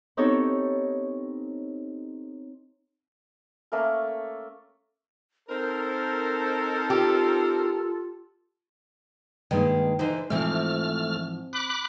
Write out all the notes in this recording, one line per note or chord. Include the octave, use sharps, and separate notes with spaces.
B3 C4 D#4 G4 A4 C#5
A3 A#3 C#4 A#4
C4 D#4 A4 A#4 C5
F4 G4
G2 D#3 G#3 A#3
D3 E3 D#4 C5
G#2 E3 F3 A3 C4 F6
B5 D6 F#6